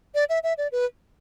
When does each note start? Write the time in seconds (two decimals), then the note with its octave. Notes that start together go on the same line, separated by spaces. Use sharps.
0.15 D5
0.29 E5
0.43 E5
0.58 D5
0.72 B4